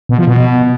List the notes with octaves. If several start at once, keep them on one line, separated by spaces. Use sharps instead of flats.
B2
F3
B2